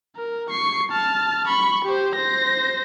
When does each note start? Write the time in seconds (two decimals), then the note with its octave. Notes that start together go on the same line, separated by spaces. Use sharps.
0.16 A#4
0.50 C#6 C7
0.91 A5 F6
1.47 B5 C#6
1.85 G4 C5
2.15 C5 A#6